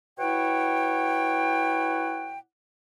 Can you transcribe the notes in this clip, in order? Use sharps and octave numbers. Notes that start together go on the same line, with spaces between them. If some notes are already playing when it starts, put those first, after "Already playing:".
B2 E4 C#5 F#5 G5